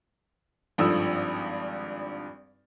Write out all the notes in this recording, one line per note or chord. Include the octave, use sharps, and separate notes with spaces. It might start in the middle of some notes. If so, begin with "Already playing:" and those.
G#1 G2 F3 A4 D#6 E6